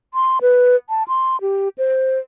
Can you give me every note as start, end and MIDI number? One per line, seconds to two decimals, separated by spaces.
0.14 0.39 84
0.42 0.76 71
0.89 1.03 81
1.08 1.40 84
1.41 1.69 67
1.78 2.19 72